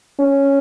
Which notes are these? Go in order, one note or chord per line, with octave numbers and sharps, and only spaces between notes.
C#4